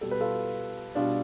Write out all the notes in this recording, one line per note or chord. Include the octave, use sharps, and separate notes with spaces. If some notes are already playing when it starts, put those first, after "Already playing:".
B2 G3 A4
B4
F4 A4
B2 G3 D4 F4